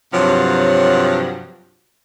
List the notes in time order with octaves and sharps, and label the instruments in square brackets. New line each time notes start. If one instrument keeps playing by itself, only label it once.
[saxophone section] G2 C3 F3 F#3